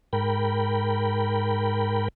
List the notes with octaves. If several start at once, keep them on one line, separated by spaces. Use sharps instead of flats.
G#2 A#4 G5 B5